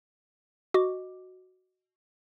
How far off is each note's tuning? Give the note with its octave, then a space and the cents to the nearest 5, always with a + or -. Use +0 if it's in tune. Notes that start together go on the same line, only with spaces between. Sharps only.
F#4 +0 D#5 -5 D6 +0